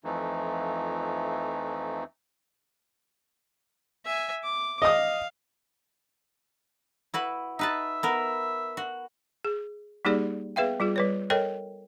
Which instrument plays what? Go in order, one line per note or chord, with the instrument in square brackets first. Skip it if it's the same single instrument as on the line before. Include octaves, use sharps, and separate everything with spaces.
[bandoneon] F2 E3 F3 A3 D#4
[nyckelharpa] E5 G#5
D6
[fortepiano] D#5 D#6 [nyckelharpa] F5
[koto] E4 F#4 B4
[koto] D#4 B4 A5 [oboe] E5
[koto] B3 A#4
F#4
[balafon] G#4
G3 A#3 D#4 G4 G#4 D5
B3 G#4 B4 E5 F5 G5
G3 F4 G#4
G3 B4 C#5
A4 A#4 C#5 D#5 G5